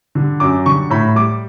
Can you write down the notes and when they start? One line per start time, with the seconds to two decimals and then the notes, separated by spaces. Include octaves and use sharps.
0.15 D3 G3
0.40 F#2 D6
0.66 D3 G3 C#6
0.90 A2 B5
1.15 G3 D6